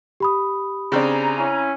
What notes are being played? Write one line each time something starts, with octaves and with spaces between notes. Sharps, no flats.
G4 B5 D#6
C#3 C4 D4 G#5 A#5
C#4 E4